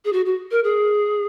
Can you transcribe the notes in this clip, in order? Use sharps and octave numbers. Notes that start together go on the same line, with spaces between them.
G#4
F#4
F#4
A#4
G#4